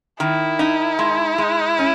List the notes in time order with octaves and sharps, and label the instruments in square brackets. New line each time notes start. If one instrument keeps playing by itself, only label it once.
[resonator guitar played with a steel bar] D#3 [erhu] E4
[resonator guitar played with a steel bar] D#4
G#3
G#3
C#4